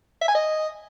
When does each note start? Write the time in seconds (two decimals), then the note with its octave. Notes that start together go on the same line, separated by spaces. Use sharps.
0.22 E5
0.28 G#5
0.35 D#5